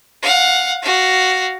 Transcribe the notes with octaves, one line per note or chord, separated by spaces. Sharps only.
F5 F#5
F#4 F5